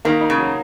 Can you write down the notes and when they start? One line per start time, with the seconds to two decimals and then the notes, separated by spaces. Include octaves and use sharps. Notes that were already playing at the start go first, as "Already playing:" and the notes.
0.05 D#3 A#3
0.21 D#4
0.30 C#3
0.38 F#3